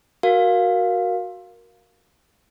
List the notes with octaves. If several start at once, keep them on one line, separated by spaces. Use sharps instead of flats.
F#4 A#4 F5